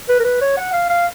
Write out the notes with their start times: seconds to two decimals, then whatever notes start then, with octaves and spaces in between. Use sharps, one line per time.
0.09 B4
0.19 A#4
0.24 B4
0.41 C#5
0.57 F#5
0.73 F5
0.89 F5